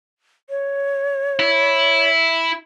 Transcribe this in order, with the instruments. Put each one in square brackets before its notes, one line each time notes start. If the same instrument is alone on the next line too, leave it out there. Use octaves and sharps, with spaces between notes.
[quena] C#5
[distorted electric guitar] E4